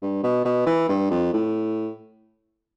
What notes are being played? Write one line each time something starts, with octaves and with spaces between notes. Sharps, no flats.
G2
B2
B2
E3
G2
F2
A2